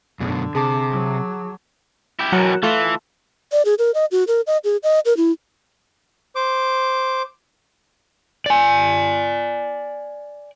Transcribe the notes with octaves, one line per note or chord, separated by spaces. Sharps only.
F#2 B2 D3
C3 G#4 A5 D6
F#3
E4 G4
E2 B2 F#3 A#4 F#5
E3 A3 F4 A4
D5
G#4
A#4
D#5
F#4
A#4
D#5
G#4
D#5
A#4
E4
C5 D6
D5 G#5